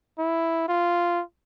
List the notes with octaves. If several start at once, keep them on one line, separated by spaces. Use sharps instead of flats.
E4
F4